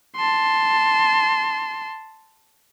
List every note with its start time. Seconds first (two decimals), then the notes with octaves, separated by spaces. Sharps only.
0.16 A5 C6